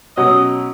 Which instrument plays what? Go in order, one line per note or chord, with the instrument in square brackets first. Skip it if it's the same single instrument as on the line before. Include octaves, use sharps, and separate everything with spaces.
[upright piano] B2 F#3 C#4 [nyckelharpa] D#5